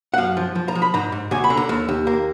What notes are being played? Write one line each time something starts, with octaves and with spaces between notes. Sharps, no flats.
F#5
F#2 F5
F3
F3
A#5
F3
B5
G#2 A#5
G#2
D2 G#5
B5
D3
A#5
D#2
D#2
A#3